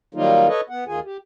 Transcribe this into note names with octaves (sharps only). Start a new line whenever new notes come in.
D#3 F#3 G3 A#3 D#4 F4
A4 B4 C#5 D#5
B3 F#5
D2 D#3 F4 G#4 G#5
G4